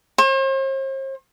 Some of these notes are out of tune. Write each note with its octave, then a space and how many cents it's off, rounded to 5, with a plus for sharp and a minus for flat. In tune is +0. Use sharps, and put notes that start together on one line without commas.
C5 +45